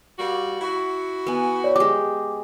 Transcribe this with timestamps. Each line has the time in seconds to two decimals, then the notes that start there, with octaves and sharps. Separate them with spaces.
0.19 G3 A#3 F#4
0.61 E4 F#4
1.27 B3 G#5
1.64 C#5 D5
1.76 G#3 G4 D6